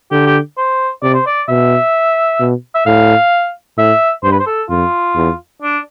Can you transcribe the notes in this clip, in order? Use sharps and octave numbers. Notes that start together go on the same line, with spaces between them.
D3 G4
G4
C5
C3 D5
C5
D5
B2 E5
B2
E5
A2 F5
A2 E5
G2 C5
B4
C5
A4
F2 F4
E2
D4